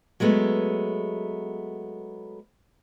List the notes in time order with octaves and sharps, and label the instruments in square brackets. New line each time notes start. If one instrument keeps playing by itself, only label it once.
[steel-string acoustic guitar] F#3 G#3 A3 B3